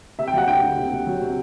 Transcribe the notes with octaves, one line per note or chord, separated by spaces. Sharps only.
C3 E5
G5
F#3 F#5
D2 G5
D2
C3
C3
F#3
C3